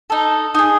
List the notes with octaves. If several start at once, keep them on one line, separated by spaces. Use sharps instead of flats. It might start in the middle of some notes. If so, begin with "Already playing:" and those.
D#4 A4
D#4 G#4